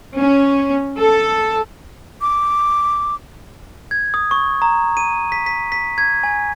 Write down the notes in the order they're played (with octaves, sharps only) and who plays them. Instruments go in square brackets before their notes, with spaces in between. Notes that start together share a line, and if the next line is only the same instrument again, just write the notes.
[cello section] C#4
A4
[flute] D6
[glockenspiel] G#6
D#6
C#6
A#5
D#7
B6
B6
B6
G#6
G#5